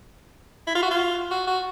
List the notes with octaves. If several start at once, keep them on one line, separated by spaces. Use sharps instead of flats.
E4
F4
F#4
F4
F#4
F#4